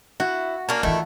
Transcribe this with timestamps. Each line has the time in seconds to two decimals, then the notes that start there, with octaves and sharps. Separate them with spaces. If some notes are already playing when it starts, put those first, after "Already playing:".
0.20 E4 F#4
0.69 A#3 C#4 D4
0.83 D#3 E3 A3 E4 F4